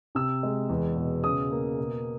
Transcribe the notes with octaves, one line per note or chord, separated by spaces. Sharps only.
C3 E6
G#3
E2
B2
C#3 D#6
A#3
B2